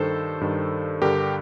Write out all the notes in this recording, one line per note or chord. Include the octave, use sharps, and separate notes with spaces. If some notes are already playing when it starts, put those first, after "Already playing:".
Already playing: G2 D#3 A4 C5
G2 D#3
G2 D3 G4 A#4